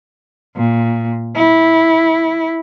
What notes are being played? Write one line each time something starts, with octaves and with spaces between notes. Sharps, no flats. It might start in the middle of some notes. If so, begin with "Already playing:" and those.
A#2
E4